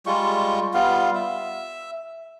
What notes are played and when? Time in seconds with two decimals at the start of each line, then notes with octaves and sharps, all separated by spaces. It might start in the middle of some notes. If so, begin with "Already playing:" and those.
0.06 G3 G#3 F4 C#6
0.74 G3 B3 F4 F5
1.15 E5